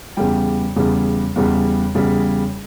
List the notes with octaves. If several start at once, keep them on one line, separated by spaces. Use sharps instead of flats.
E2 C#3 G3 G5
E2 C#3 G3
E2 C#3 G3
E2 C#3 G3